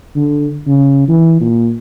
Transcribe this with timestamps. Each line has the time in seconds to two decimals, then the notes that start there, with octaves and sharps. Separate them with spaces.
0.16 D3
0.67 C#3
1.08 E3
1.41 A#2